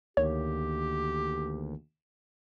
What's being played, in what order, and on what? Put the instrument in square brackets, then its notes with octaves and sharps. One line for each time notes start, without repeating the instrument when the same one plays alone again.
[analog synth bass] D2 [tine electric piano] D#3 A#3 [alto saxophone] G4 [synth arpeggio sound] C#5